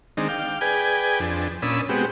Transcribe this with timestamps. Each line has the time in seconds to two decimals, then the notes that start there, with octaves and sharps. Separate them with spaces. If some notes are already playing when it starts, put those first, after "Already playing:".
0.17 D#3 G#3 C4 D4 D#4
0.29 F5 G5 D6
0.61 G#4 B4 D5 G5 G#5
1.20 F2 D4
1.62 A#2 C#4 D4 B5 D#6 E6
1.89 G#3 B3 C4 F#4 G4